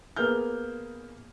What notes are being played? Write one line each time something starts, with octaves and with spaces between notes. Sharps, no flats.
A#3 B3 G#4 F6 G6